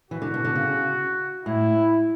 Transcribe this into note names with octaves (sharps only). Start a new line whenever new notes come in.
E3 F#4
D3
B2
D3
C#3
A2 E4